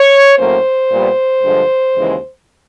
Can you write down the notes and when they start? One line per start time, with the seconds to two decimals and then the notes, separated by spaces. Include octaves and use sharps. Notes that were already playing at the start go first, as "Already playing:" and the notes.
Already playing: C#5
0.38 A2 F#3 A#3 C#4 C5
0.91 A#2 G3 B3
1.43 G2 D3 F3 G#3
1.96 D#2 C#3 E3 G#3